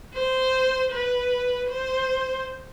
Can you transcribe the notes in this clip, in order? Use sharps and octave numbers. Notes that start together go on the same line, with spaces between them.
C5
B4
C5